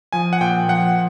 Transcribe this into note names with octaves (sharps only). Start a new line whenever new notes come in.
F3 G#5
F#5
A#2 G5
F3 F#5